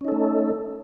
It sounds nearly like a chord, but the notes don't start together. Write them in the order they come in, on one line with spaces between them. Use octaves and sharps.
C#4 D#4 A4 A3